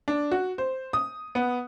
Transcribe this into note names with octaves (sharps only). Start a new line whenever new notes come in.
D4
F#4
C5
D#6
B3